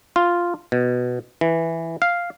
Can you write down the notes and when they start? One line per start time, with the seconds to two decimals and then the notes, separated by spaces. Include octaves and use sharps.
0.16 F4
0.72 B2
1.41 E3
2.02 F5